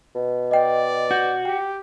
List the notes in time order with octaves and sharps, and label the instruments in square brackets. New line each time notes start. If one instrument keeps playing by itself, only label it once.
[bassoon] B2
[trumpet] D5 [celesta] D#5 G5
[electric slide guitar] F#4 [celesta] G6
[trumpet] G4 [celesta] G5